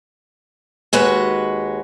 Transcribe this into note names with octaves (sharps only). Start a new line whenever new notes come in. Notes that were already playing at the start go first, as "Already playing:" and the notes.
D#2 G#3 F#4 B4